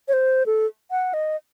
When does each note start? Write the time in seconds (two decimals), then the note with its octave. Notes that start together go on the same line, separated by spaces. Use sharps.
0.08 C#5
0.13 C5
0.46 A4
0.91 F#5
1.14 D#5